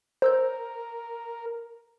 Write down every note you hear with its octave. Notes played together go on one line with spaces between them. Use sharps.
A#4 C5 E6 G6